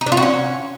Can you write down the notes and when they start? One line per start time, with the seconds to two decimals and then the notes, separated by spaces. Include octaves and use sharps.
0.01 D#4
0.06 D4
0.12 F4
0.17 F#4
0.23 C#4